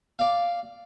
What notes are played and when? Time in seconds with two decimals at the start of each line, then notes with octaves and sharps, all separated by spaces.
0.19 D5 F5